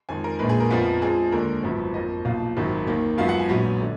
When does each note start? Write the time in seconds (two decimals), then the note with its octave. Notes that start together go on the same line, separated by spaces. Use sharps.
0.09 F2 D#3 G#3 G#5
0.24 A#4
0.39 A#1 A#2 G#3 B4
0.49 G#4
0.60 A#4
0.70 F2 F3 B3
1.02 F2 F3 G#3 G#4
1.32 D#2 D3 G#3 A#4
1.63 G#1 F#2 F3 B3
1.94 F2 F3 A#3 D#5
2.25 B1 A#2 F3 F5
2.57 G#1 F#2 D#3
2.87 D#2 D#3 A#3
3.18 F#2 F3 G#3 B3 F5
3.29 F#5
3.40 G#5
3.49 A#1 G#2 F#3 B3
3.81 D3